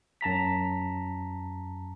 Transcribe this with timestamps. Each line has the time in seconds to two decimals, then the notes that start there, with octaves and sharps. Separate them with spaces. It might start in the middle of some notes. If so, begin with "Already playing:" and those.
0.21 F#2 A5 A#5 B6